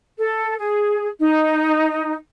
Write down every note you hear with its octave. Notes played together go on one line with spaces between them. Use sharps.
A4
G#4
D#4